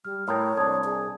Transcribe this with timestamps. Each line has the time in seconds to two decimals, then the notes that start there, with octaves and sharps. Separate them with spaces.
0.05 G3 F6
0.28 A2 A#4 C#5 G5 D#6
0.57 C2 D4 A5 D#6 G#6
0.84 G#4